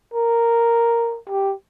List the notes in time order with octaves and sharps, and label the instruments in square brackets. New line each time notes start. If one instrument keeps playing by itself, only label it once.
[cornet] A#4
G4